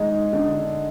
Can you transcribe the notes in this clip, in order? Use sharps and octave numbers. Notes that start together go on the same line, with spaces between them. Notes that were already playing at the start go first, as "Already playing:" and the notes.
Already playing: G#3 D#4 D#5
D3